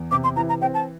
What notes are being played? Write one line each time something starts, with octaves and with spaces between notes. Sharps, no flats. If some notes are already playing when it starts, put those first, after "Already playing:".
Already playing: E2
C3 D6
C6
E3 A#5
A#5
C4 G5
A5